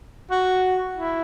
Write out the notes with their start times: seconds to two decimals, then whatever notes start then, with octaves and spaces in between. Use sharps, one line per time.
0.31 F#4
0.97 E4